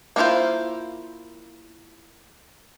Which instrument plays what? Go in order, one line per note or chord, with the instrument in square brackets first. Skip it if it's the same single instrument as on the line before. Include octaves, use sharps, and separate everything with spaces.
[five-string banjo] A#3 D4 E4 F4 C5